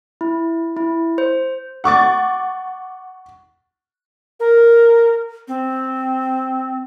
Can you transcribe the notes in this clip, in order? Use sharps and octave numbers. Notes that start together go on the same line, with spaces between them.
E4
E4
C5
F#5 C#6 D6 A6
A#4
C4